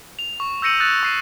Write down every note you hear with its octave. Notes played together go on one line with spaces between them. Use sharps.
F7
C#6
E6 G6 A#6 C#7 D#7 F#7
D#6 E6 F#6 A6
C#6 C7 D#7